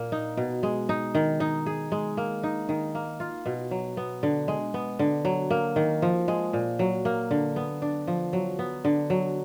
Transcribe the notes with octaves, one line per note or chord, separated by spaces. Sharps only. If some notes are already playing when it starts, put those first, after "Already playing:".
Already playing: A#2 A#3
D#4
B2
G#3
D#4
D#3
D#4
G#4
G#3
A#3
D#4
D#3
A#3
F4
B2
F#3
B3
D3
G#3
B3
D3
F#3
A#3
D#3
F3
G#3
A#2
F#3
A#3
D3
B3
D4
F3
F#3
B3
D3
F#3